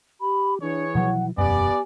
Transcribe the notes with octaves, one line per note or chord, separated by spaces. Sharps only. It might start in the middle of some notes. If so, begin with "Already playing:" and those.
G4 B5
E3 D4 G#4 B4 C#5
B2 F3 F#3 F#5
E1 F#2 B3 G4 D5 G#5